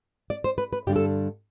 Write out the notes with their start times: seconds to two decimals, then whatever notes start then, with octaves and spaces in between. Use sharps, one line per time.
0.30 D5
0.44 C5
0.58 B4
0.73 B4
0.87 G2 D3 G3 D4 G4
0.96 A4